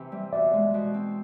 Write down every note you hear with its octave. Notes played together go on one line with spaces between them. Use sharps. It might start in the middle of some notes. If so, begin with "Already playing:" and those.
Already playing: C3 E3 C4
G3
B2 D5 E5
G#3
B2
C4